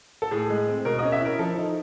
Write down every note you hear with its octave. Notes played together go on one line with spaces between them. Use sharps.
A4
A2 G#4
G#3
C4
B2 A#4
C#4 D#5
E5
E4 A#4
F3 A4
D#4